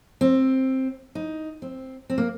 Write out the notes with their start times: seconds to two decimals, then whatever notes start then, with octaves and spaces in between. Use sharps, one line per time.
0.21 C4
1.15 D#4
1.62 C4
2.10 C4
2.18 A#3